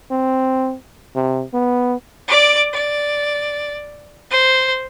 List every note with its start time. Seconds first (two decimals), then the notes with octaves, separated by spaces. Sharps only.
0.11 C4
1.15 C3
1.53 B3
2.28 D5 D6
2.71 D5
4.28 C5